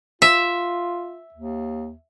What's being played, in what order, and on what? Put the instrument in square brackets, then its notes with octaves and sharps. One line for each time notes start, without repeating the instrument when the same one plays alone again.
[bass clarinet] F4 [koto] E5
[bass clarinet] D#2